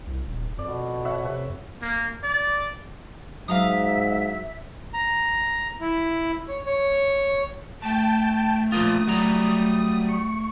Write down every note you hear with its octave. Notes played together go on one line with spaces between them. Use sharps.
C2
D#1
F2 B2 D5
C#5 E5 F#5
C3 B4
A#3
D5
G#2 F#3 E5 F5 A#5 D#6
A#5
E4
C#5
C#5
A3 G5 A5
F3 A#3 F4 D#6
F#3 G3 A#5
C#6